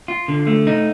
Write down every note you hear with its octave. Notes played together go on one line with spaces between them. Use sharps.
F4
D3
A3
D#4